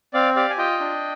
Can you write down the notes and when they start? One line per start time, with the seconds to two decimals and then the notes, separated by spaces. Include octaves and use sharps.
0.13 C4 D5 F5
0.36 G4 D5 F5
0.50 G#5
0.57 F4 D#5 G5
0.80 D4